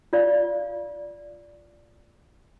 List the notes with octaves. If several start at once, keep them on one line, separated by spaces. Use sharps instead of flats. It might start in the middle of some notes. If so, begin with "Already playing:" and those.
F4 D5 F5